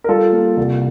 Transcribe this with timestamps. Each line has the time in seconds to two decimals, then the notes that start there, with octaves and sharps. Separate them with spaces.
0.04 A#4
0.08 G3 F4 A4
0.32 A#3
0.57 C2